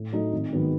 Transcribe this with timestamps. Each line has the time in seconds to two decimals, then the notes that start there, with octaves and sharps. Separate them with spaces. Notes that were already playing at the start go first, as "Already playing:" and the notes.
Already playing: A2
0.13 F#3 A3 D#4
0.33 G#1
0.52 G#2 D#3 F#3 B3